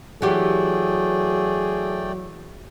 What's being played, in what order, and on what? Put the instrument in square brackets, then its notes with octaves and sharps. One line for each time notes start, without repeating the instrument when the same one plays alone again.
[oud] E3 B3 G4 [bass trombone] F#3 [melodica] A3 D5 G5 [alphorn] G#4